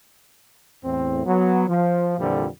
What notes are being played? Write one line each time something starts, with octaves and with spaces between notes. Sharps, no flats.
E2 A2 C4
F#3 B3
F3
F2 A#2 D3 E3 F3 G3